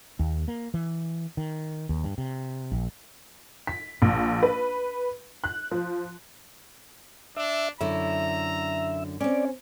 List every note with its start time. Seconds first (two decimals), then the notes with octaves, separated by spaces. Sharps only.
0.19 D#2
0.48 A#3
0.74 E3
1.37 D#3
1.89 D#2
2.04 G2
2.18 C3
2.72 A#1
3.67 B6
4.02 A#1
4.43 B4
5.44 F#6
5.71 F3
7.37 D4 E5
7.81 F#2 D3 E4 E5 A#5
9.21 C4 C#4 D5